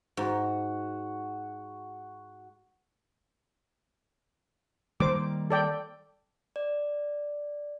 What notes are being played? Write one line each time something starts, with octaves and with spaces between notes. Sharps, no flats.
G#2 F#4
D#3 G3 A#3 C5 D6
A4 D5 G5
D5